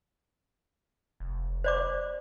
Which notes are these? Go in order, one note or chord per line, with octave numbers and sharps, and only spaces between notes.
F1
C5 D5 D6